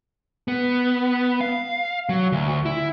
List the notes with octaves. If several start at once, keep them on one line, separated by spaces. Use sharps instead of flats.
B3
F5
F#3
D2
E4